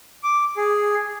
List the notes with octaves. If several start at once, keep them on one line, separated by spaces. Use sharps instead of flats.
D6
G#4